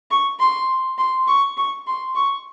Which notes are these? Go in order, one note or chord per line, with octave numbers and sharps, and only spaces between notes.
C#6
C6
C6
C#6
C#6
C6
C#6